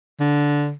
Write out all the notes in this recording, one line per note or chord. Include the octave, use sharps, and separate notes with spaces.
D3